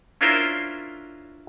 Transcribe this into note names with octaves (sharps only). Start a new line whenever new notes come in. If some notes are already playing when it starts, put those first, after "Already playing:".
C#4 D4 E4 F4 A#4 C5